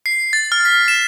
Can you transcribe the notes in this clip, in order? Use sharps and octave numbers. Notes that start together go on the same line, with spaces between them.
C7
A6
F6
B6
E7